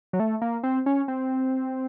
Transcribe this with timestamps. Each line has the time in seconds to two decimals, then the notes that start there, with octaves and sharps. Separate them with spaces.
0.13 F#3
0.20 A3
0.42 A#3
0.63 C4
0.86 C#4
1.08 C4